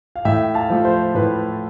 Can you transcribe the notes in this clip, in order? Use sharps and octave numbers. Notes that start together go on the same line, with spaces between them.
F5
A2 E5 G5
F5 A5
F3 A3
C5
A2 B4